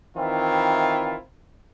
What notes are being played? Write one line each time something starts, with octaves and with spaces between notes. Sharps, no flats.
D#3 E3 C4 E4 F4